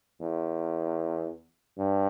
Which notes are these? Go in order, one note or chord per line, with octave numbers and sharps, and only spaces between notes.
E2
G2